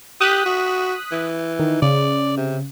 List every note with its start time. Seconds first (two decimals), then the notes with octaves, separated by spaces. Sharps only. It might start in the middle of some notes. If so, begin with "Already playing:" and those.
0.21 G4 D#6 F#6 B6
0.46 F#4
1.12 E3
1.59 D#3
1.82 C#3 D5
2.37 C3